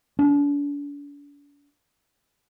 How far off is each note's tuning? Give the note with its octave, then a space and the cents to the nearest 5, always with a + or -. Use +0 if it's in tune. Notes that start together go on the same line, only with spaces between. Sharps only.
D4 -40